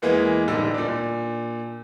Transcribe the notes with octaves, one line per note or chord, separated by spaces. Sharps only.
E2 E3 G#3 A#3 B3
D1 D3 G3 D#4 E6
A#2 D4